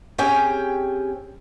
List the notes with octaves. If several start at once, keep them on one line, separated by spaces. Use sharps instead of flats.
C4 C#4 G4 G#4 G5 G#5